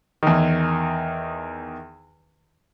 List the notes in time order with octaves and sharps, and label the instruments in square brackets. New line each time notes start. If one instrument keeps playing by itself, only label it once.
[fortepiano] E2 D#3